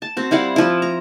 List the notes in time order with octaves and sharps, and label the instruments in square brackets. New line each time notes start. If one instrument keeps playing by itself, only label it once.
[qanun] A5
C4 F#4
G3 E4 F5 F#5
F3 E4
A#5